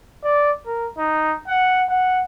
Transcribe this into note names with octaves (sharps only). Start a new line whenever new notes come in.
D5
A#4
D#4
F#5
F#5